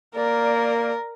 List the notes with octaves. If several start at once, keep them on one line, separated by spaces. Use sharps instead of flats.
A#3 A#4 D5